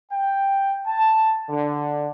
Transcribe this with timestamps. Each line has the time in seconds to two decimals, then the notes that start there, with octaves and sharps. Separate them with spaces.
0.12 G5
0.87 A5
1.50 D3